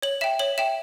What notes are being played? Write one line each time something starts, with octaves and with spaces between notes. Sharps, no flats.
C#5 F#7
E5 G5 E7
C#5 F#7
E5 G5 E7